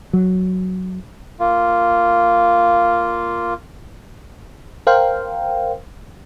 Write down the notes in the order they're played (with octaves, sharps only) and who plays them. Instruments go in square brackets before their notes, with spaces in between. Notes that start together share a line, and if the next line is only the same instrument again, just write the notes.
[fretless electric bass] F#3
[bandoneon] A#3 F4
[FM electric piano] A#4 C5 F5 G5